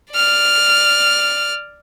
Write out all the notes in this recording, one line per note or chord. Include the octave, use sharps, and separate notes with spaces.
D5 F6